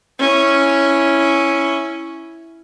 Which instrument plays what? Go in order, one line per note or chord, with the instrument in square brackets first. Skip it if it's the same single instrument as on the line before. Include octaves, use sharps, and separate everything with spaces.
[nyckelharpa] C#4 E4